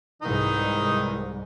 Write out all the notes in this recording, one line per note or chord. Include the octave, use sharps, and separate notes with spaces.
C2 G#2 D#3 E3 D#4